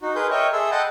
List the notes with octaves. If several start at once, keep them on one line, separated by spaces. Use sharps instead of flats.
D#4 F#4
G#4 A#4 B4 C6 G6
A#4 C#5 D#5 E5 G5 C#6
G#4 A4 E5 C6 E6
D#5 F#5 G5 A5 B5